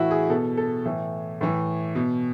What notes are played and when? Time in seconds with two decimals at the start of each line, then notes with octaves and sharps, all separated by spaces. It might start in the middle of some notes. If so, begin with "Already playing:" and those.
Already playing: A2 E3 E4 F#4
0.11 G#4
0.30 B2 A4
0.57 A4
0.85 A2 E3
1.41 A2 E3
1.95 B2